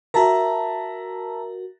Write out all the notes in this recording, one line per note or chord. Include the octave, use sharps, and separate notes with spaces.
F#4 A#4 E5 A5 A#5